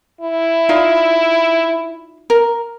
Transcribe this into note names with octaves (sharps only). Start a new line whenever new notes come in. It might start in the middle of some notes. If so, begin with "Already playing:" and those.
E4
D#4 F4 D5
A#4